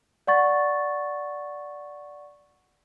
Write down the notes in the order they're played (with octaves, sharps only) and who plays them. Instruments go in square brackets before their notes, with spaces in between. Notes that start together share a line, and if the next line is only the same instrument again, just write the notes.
[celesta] D5 F#5 C#6 A6